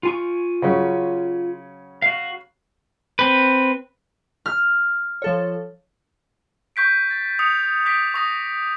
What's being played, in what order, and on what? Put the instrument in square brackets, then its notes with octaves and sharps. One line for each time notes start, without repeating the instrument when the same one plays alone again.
[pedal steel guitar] F4 G#5 C#6
[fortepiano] C#3 F#3 C#4
[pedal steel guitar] F#4 F5
C4 B4
[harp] F6
[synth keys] F3 A4 C#5
[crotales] C#6 G6 B6 D7
A6
D#6 C#7 F7
D6 G6 B6 D7
C#6 D#6 A#6